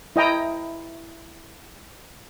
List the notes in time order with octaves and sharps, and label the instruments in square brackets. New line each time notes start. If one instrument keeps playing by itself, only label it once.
[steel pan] E4 D#5 G5 A#5